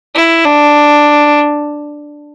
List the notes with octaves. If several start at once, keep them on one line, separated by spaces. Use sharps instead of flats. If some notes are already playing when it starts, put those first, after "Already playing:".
E4
D4